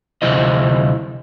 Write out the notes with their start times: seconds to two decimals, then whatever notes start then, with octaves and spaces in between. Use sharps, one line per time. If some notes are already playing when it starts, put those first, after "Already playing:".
0.22 D2 C3 F3 E4 C5 D#5